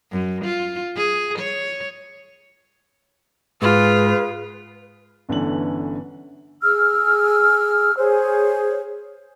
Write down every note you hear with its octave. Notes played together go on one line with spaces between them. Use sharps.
F#2
F4
G#4
C#5
G#2 F4 G#4 B4
G1 D3 E3 C#4 F#7
G#4 E6 F6
G#4 C5 C#5